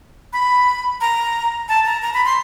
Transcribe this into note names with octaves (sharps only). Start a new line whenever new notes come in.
B5
A#5
A5
A#5
A#5
B5
C6